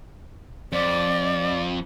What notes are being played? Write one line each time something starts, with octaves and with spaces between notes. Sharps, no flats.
F2 D5